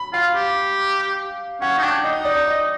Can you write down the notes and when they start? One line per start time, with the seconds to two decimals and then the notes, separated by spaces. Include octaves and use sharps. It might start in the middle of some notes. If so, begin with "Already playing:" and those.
Already playing: B5
0.13 F4 F5
0.35 G4
1.61 C#4 F#5
1.78 D#4
1.83 D4 G5
2.04 D#4 D#5
2.25 D5
2.47 D#5